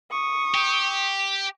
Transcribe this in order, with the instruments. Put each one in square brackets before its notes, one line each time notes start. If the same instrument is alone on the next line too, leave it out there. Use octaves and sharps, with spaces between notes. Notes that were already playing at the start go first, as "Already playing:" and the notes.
[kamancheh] C#6 D#6
[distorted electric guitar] G4